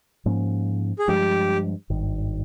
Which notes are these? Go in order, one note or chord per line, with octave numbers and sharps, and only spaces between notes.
G#2 F3 A#3 C#4
G#4
G2 F3 G#3 G4
G#1 G2 D#3